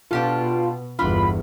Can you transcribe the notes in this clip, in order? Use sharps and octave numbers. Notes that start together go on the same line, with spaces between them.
B2 D4 F4 G4 A4
G1 E2 D4 F4 B5